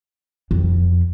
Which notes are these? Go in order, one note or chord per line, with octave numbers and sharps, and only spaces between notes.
F2